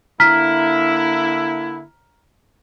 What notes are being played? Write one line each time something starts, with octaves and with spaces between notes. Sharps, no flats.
D3 A#3 E4 A#5 F6 B6